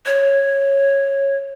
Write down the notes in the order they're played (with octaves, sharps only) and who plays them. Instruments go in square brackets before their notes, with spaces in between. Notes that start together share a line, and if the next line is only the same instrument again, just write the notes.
[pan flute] C#5